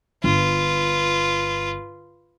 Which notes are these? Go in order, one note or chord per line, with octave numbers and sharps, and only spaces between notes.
G1 F4 B4